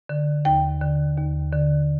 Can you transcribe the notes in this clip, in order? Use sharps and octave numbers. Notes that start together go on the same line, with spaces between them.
D3
D#2 G5
D3
D#2
D3